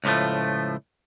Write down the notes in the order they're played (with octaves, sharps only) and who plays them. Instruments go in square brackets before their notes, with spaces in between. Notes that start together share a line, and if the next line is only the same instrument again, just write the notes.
[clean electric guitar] C#2 A2 F3 A3